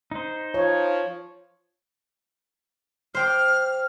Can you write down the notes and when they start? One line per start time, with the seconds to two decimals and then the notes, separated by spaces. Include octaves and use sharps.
0.11 D#4 C5
0.54 F3 C#5
3.15 C5 G5 D6 F6